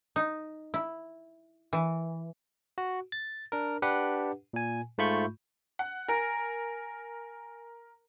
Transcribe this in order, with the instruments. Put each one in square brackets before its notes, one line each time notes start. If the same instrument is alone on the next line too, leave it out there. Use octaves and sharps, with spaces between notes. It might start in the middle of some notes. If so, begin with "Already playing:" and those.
[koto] D#4
E4
E3
[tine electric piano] F#4
A6
D4 A#4
D4 G4 B4 F#5
A#2 G#5
G#2 A3 F4 B5 C#6 G6
[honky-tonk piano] F#5
[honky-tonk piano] A#4 [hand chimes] G#5 A#6 D7